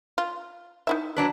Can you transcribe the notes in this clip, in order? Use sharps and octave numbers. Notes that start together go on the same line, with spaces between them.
F4
D#4 E4 E5
F#3 D4 B4